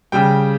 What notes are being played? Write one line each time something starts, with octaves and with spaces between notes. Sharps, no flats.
C#3 G3 G5